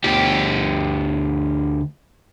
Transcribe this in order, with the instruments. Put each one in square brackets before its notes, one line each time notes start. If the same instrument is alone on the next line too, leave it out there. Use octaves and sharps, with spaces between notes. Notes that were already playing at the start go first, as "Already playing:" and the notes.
[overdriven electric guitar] D2 G4